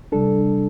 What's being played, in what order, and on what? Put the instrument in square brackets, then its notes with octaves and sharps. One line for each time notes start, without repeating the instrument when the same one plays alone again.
[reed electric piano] C3 G3 D4 A4